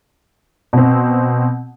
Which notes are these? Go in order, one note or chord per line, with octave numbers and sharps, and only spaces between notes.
B2 C4